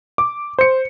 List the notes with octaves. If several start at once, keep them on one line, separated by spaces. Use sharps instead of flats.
D6
C5 C#7